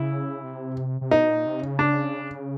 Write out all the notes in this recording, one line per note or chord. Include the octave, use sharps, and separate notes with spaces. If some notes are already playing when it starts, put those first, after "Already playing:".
Already playing: C#3 E4
C3
C3
B2 D#4
A#2
C3
C#3
D4